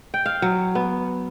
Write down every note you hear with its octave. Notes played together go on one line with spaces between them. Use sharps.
G5
F5
F#3
B3